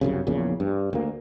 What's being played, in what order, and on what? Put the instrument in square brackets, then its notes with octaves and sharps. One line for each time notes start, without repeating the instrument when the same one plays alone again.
[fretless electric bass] G1 C2 F#2 C#3
A#1 E2 A#2 C#3
G2
D2 A#3